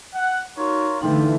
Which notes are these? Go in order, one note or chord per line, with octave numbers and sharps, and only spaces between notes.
F#5
D#4 F4 F#4 A#4 C#5
D3 E3 A3 D#4 F4 G4